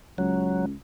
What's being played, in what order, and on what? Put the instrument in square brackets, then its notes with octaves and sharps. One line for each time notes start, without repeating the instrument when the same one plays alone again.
[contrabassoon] C#2 [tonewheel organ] F#3